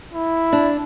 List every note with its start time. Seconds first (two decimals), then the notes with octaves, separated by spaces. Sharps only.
0.13 E4
0.53 D4